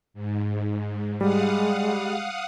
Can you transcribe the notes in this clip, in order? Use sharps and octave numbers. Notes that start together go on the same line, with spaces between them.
G#2
G3 G#3 F5 F#5 D#6